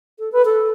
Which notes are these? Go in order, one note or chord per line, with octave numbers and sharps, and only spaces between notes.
A4
B4
A4